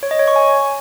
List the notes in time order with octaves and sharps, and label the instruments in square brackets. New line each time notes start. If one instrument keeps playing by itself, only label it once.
[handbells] C#5
D#5
C#5
C#6
G#5